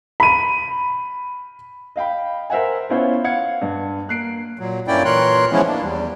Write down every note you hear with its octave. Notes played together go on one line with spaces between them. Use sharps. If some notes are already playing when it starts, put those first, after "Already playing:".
B5 D#7
D#5 F5 G5 B5
A#4 C5 E5 F#5 G#5
B3 C#4 E4 F4 C5 C#5
F5 F#5 G#6 C#7
G2
A#3 F#6 C7 D7
A#2 F#3
G2 A#3 C#4 E4 D5 G5
A#2 E3 A#4 C#5 C6 F#6
E3 F3 G#3 B3 C#4 E4
A#3 D4
E2 G3